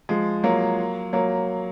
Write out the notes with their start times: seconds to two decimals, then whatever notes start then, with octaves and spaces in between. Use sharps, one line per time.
0.09 F3 G#3
0.44 F#3 A#3
1.13 F#3 A#3